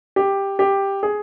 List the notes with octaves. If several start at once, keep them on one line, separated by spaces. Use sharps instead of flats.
G4
G4
G#4